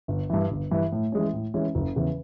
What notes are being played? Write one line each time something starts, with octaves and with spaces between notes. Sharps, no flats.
G1
G2 E3
G1
G2 E3
A2
E3 G#3 C#4
A2
E3 G#3 C#4
F#1
E2 C#3 E3